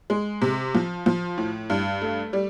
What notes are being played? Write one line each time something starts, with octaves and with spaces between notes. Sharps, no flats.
G#3
C3
F3
F3
A2
G2
A3
G3